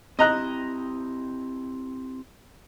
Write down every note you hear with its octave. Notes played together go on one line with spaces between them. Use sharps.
C4 E4 G4 D#5 A#5 F#6